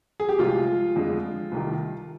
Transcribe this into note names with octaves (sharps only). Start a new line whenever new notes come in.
G#4
G4
C2 C3 F3 G#3 F4
F2 D3 F3 G#3
C2 C3 D#3